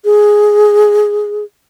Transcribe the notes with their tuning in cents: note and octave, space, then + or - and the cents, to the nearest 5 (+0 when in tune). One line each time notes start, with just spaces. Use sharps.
G#4 +5